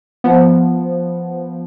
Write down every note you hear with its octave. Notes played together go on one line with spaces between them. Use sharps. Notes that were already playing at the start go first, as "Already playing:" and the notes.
F3 B3